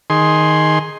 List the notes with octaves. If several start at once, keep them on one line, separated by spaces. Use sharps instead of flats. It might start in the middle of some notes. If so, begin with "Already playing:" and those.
D#3 G#4 C6